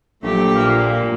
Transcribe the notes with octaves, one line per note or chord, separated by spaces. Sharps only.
A#1 F#3 A3 G4
A#2 A#3